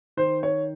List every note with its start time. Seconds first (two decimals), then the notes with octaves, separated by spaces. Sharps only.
0.17 D#3 C5
0.43 C#5